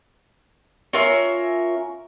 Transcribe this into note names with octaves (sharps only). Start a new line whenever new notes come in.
C#4 F4 A#4 E5